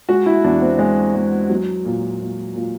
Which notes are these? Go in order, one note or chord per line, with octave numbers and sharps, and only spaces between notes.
G#3 F#4
E4
E2 D4
C4
G#3
G#3
F#3
A#2
A#2
A#2